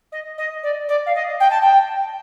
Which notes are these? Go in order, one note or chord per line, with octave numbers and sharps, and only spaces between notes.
D#5
D#5
D5
D5
F5
D#5
G5
A5
G5